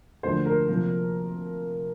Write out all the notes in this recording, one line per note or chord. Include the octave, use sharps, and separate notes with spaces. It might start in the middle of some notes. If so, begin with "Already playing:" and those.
D2 D3 F3 A#3 C5
A#4
C3 F3 A#3